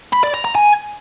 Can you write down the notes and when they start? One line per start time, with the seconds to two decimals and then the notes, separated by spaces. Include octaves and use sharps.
0.13 B5
0.24 D5
0.34 A#5
0.45 A#5
0.55 G#5